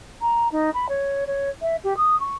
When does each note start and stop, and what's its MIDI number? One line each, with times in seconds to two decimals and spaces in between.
0.21 0.48 82
0.52 0.70 63
0.74 0.87 83
0.89 1.25 73
1.27 1.50 73
1.62 1.76 76
1.84 1.97 67
1.97 2.18 87
2.20 2.37 85